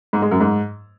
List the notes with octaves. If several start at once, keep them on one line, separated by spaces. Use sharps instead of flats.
G#2
G#3
F#2
G#2